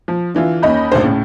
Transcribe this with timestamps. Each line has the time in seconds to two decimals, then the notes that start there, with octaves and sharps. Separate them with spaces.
0.08 F3
0.34 D3 E3 F4
0.62 D#2 C#4 D#5 B5 G6
0.92 G#1 D2 D#3 C5
1.04 A2 C#3